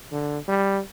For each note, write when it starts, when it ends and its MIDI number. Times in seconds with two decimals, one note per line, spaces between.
0.12 0.38 50
0.48 0.80 55